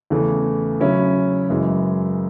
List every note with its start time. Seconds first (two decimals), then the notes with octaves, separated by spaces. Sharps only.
0.10 E2 C#3 E3 A3
0.80 C#3 F#3 C#4 E4
1.50 F#2 C#3 E3 G#3